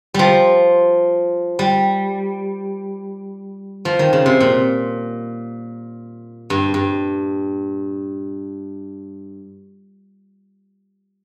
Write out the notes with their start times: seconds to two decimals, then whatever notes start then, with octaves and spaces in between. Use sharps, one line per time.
0.14 F3 G3
1.59 G3
3.85 F3
3.99 D#3
4.13 C#3
4.26 C3
4.40 A#2
6.50 G2
6.74 G2